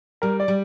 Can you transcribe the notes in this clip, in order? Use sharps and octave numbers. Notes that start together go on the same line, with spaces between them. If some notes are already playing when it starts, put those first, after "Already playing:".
G3 A#4
D5
G3